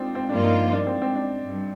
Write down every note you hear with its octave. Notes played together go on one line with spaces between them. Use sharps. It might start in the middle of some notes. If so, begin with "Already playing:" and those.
Already playing: C4 D4 D#4 F4
C4
G2 F3 A#3 D4 F4
D#4
D4
C4
C4
D4
G2